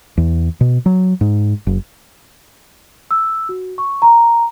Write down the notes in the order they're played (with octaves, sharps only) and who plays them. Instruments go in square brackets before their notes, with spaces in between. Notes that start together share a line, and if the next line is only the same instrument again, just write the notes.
[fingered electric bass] E2
B2
F#3
G#2
F#1
[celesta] E6
F#4
C#6
A#5